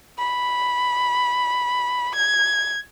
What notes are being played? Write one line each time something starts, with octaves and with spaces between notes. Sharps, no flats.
B5
G#6